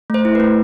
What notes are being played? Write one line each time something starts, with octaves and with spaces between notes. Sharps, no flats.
A3 C5
E4
A3 B4